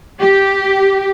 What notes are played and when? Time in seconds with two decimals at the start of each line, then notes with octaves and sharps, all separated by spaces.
0.21 G4